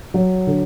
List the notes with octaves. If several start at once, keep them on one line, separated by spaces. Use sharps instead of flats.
F#3
D3